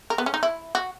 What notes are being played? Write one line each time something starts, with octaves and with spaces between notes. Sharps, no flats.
A#4
B3
C#4
D#4
E4
F#4